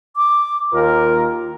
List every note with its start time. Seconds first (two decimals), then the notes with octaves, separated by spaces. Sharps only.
0.17 D6
0.73 D#2 F4 A#4